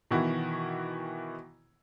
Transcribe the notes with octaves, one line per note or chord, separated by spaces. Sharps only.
B2 D#3 E3 E4 F#4